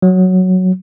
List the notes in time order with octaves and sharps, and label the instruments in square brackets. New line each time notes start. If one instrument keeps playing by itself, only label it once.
[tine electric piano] F#3